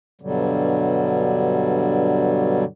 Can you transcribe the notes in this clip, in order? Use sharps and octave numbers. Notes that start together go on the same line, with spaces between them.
G2 B2 D3 F#3 G3